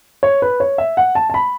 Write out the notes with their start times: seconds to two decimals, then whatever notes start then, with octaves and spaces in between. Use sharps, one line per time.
0.23 C#5
0.42 B4
0.60 C#5
0.78 E5
0.97 F#5
1.15 A5
1.30 A5
1.34 B5